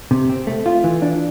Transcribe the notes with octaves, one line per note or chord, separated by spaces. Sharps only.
C3
C4
A3
F4
E3
D4